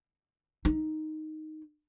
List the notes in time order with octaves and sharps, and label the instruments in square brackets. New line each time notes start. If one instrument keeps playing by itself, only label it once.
[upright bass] D#4